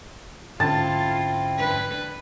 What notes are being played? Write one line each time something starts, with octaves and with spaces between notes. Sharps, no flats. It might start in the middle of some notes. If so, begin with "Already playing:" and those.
G#2 D3 C4 C#4 E4 F4 A5
D4 B4